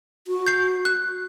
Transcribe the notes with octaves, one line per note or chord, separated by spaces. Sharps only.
F#4
G6 C7
F#6